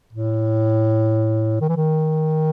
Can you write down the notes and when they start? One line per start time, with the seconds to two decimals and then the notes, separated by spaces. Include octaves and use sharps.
0.13 A2
1.61 D#3
1.69 E3
1.76 D#3